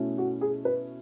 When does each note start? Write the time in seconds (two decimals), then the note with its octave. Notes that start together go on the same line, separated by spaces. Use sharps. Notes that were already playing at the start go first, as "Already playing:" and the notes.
Already playing: B2 A3 C#4 E4
0.18 F#4
0.41 G#4
0.65 B4